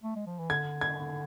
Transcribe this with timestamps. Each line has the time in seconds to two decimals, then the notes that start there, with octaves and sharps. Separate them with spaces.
0.03 A3
0.16 G#3
0.27 F3
0.39 E3
0.50 D3 G#6
0.81 G#6